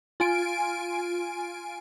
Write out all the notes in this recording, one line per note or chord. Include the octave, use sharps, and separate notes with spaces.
F4 G#5 D7